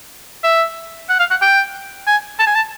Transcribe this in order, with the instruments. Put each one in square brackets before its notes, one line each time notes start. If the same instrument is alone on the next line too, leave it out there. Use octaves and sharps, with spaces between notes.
[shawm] E5
F#5
F5
F#5
G5
G#5
A5
G#5
A5